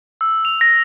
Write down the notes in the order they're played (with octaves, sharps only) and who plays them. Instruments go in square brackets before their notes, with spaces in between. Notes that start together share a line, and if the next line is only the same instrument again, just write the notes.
[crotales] E6
F7
A#6